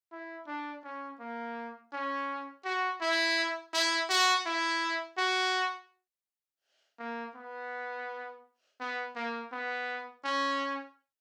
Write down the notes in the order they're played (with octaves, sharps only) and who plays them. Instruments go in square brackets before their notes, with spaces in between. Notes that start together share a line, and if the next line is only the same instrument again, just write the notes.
[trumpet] E4
D4
C#4
A#3
C#4
F#4
E4
E4
F#4
E4
F#4
A#3
B3
B3
A#3
B3
C#4